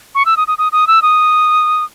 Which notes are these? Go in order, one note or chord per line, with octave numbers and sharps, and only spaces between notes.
C#6
E6
D#6
D#6
D#6
D#6
E6
D#6